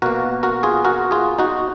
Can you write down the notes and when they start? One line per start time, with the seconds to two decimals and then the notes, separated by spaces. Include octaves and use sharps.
0.02 B2 A#3 F#4 A#4
0.43 F#4 A#4
0.63 F4 G#4
0.84 F#4 A#4
1.11 F4 G#4
1.38 D#4 F#4